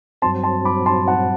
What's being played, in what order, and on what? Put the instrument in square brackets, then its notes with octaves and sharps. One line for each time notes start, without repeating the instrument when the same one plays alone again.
[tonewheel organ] G2 F#3 C4 [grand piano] A5 C6
[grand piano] A5 C6
B5 D6
A5 C6
F#5 A5